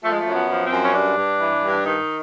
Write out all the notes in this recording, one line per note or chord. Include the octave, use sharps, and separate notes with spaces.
F3 A3
G#3
A3
F#2
B3
F3
C4
F#2
C#4
G2 D4
G2
E3
G2
D#3 D#4